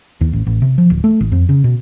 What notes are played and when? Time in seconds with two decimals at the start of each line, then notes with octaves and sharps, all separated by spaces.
0.21 D#2
0.33 A1
0.46 A1
0.62 C3
0.78 F3
0.90 D1
1.04 A3
1.20 G#1
1.32 F2
1.49 C#3
1.64 B2